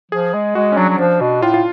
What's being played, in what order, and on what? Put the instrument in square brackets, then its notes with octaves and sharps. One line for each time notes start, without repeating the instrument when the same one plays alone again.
[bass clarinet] F3 [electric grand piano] G#4
[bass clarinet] G#3
[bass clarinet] G#3 [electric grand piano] F#4
[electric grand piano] C#4
[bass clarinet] F#3 [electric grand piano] D4
[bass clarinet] F#3
[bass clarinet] F3 [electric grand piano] D4
[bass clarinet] B2
[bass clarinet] A2 [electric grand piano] F4
[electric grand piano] F4